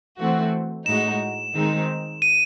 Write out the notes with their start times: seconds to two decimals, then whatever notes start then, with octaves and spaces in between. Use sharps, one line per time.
0.18 E3 A3 C4 F#4
0.86 A2 G#3 D#4 F#4 E7
1.55 D#3 G#3 C4 D#4
2.22 D#7